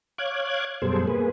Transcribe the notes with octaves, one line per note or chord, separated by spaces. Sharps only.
C#5 F5 D6 F#6 G#6
F#2 B2 G3 G#4 A4 C5
A#3 G#4 B4